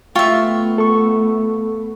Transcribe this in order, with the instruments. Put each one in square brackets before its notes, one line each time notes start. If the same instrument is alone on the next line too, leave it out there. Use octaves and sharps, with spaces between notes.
[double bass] A3 B3 [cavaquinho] F4 E5 [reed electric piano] G5 C#6
[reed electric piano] A4 C#6